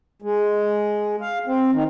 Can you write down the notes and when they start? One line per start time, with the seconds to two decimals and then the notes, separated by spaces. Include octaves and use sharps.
0.22 G#3
1.21 F5
1.47 C4
1.72 D#3